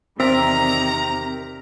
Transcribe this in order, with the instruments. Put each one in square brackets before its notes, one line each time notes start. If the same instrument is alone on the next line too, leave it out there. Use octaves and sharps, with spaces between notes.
[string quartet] E2 C3 D#3 [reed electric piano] C4 [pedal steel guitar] A#4 D5 E5 [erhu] A#5